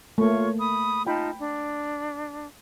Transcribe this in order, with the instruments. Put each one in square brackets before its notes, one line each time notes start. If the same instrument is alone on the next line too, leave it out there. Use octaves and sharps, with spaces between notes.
[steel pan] A3 A#3 [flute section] F4 C#5 C#6
[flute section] B5 D#6
[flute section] D#4 F4 A5 [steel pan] G5 B5
[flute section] D4